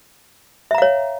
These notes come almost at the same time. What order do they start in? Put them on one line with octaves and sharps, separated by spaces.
E5 A#5 F5 C#5